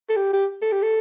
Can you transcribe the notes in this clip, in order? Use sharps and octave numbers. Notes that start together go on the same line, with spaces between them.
A4
G4
G4
A4
G4
A4